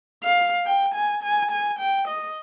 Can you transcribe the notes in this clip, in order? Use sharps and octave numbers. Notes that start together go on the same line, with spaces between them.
F5
G5
G#5
G#5
G#5
G5
D#5